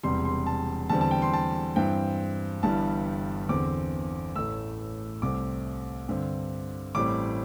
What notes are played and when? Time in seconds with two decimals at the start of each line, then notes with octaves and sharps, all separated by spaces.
0.03 E1 E2 C3 G3 C6
0.25 C6
0.46 A5
0.90 E2 D3 G3 C4 A5
1.01 A5
1.11 G5
1.22 C6
1.33 A5
1.76 G2 E3 C4 G5
2.63 G1 G2 E3 G3 A5
3.49 E2 D3 C4 D6
4.36 A1 A2 A3 E6
5.22 C2 C3 A3 C4 D6
6.09 G2 D3 C4
6.95 A1 A2 G3 C4 D6